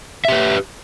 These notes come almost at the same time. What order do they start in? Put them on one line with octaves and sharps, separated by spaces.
E5 G4 B4